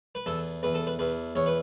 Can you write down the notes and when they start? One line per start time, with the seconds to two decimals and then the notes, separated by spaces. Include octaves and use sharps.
0.15 B4
0.26 E2 A4
0.63 E2 B4
0.74 A4
0.87 B4
0.99 E2 B4
1.35 E2 C#5
1.46 B4